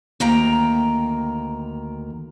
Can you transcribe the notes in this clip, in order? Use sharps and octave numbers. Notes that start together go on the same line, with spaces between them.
D2 D#3 A#3 G5 A#5